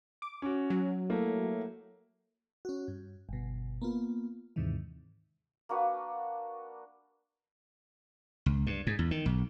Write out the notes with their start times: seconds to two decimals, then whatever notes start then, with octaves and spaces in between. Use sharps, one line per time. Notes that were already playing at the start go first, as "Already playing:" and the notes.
0.22 D6
0.42 C#4 F#4
0.70 F#3
1.10 A3 A#3 E4
2.65 C#4 F#4
2.88 G2
3.29 G1 B2
3.82 A#3 B3 F4
4.56 D#2 G#2 C3 D#3 E3
5.69 A#3 D4 F#4 B4
8.46 C#2
8.67 G2
8.87 G#2
8.99 E2
9.11 D#3
9.26 B1